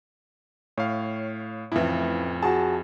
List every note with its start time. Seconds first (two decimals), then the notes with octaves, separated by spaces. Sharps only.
0.78 A2 C#5 F5
1.72 F2 A2 C#3 E3 E4
2.42 F#4 G#4 A5